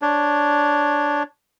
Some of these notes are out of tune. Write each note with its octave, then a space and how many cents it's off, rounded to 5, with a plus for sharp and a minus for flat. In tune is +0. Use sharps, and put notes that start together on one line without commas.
D4 -5 C#5 +0